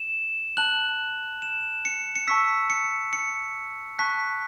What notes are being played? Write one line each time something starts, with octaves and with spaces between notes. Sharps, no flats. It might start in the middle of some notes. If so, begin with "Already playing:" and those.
Already playing: E7
A5 F#6 F#7
E7
C#7
C#7
A5 C#6 E6 B6
C#7
C#7
A5 C#6 F#6 B6